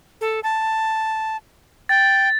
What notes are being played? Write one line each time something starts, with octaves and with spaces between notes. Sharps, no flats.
A4
A5
G5 A6